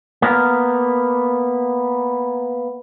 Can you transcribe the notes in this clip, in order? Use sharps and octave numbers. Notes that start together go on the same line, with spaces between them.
A#3 B3 A#4